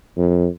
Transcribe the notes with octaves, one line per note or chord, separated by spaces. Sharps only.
F2